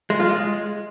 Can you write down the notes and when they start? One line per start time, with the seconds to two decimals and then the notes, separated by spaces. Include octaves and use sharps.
0.10 G#3
0.20 F4
0.29 G#3